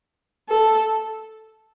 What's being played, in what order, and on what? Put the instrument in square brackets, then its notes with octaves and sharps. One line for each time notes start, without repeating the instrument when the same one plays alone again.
[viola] A4